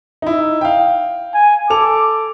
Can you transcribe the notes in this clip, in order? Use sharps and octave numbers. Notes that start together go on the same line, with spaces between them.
D#4 E4
F5 G5
G#5
A4 D6 F7